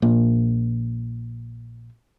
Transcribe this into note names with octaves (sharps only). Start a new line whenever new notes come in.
A#1 A#2